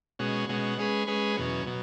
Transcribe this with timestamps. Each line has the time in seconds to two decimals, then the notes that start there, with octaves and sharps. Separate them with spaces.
0.19 B2 G#3 C#4 F#4
0.49 B2 G#3 C#4 F#4
0.78 G#3 C#4 G#4 B4
1.07 G#3 C#4 G#4 B4
1.37 E2 B2 F#3 C#4
1.66 B2 F#3